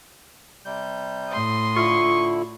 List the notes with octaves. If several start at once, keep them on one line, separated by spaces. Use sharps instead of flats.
C3 G3 G6
A2 C6 D#6
D3 E4 F4 C#6